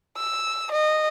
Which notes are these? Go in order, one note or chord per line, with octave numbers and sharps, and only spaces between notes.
E6
D#5